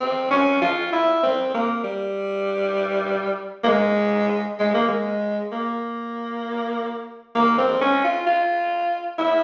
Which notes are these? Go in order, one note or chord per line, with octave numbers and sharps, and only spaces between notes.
C4
C#4
F4
E4
C4
A#3
G3
A#3
G#3
G#3
A#3
G#3
A#3
A#3
C4
C#4
F4
F4
E4